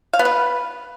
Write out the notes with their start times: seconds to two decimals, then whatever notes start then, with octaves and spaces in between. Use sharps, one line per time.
0.13 F5
0.19 B3
0.25 B4